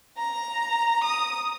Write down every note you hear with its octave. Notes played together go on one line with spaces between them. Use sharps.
A#5
D#6